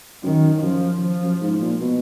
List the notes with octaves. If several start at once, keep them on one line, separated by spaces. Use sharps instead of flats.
F#2 D#3
F#2 F3
F3
F#2
G#2
A#2
B2